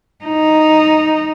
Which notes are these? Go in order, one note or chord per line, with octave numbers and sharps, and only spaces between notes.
D#4